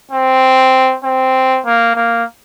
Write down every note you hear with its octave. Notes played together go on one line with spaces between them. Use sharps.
C4
C4
A#3
A#3